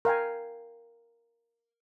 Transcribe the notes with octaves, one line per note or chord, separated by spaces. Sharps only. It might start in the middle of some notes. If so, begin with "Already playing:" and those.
A#4 F5 G5 G#5